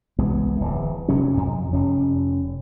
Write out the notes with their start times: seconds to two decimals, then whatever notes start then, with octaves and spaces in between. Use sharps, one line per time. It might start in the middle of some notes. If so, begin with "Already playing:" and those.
0.18 C2 E3 G#3 B3
0.57 D1 E3
1.08 F1 C3 F#3 C#4
1.37 F2
1.73 F1 C#4